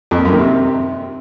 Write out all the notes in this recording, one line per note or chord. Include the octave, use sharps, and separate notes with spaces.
F2
A#2
F#2
D#3
C3